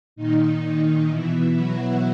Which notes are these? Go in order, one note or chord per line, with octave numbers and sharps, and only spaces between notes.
A#2 D#3 D#4
B2 E3 E4
F#3 F#4